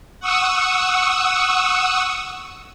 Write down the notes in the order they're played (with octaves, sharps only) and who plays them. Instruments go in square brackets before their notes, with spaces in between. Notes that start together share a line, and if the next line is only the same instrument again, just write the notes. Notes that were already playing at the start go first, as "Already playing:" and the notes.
[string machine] F#5 C#6 D#6 E6